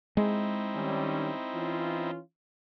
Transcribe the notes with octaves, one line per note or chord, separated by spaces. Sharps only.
G#3 C4 D#4 E4
D#3 G3 C#4
E3 C#4 F4